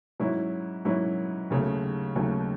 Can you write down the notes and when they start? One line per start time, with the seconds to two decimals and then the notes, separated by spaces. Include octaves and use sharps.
0.20 G#2 F#3 C#4 E4
0.85 G#2 F#3 C#4 E4
1.50 D#2 C#3 F#3 A3
2.16 D#2 C#3 F#3 A3